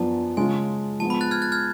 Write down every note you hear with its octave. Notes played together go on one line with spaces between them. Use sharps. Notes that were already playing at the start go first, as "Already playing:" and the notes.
Already playing: F#2 F3 B3 D4 A5
C#3 G#3 C#4 F4 G#5
F3 G#3 B3 A5
B5
F#6 A6
F6 G#6
F#6 A6
F6 G#6